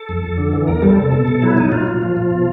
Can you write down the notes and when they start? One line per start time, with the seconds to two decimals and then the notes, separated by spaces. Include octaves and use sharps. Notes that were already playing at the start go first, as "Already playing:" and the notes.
Already playing: A4
0.09 F2
0.23 F2
0.38 D3
0.52 E3
0.67 E2 A#4
0.82 G3 A4
0.97 C3
1.12 B2
1.28 B2
1.42 F#3 E4
1.57 F#3 D#4
1.72 A#2 F4
1.87 A#2
2.02 F3
2.17 F3
2.31 B2